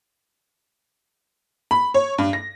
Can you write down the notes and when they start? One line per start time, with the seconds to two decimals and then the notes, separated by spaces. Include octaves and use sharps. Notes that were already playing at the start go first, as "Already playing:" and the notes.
1.71 B5
1.94 C#5
2.18 G2
2.33 A#6